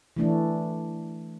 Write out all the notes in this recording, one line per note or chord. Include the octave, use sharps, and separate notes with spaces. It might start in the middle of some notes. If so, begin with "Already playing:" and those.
E3 A3 D4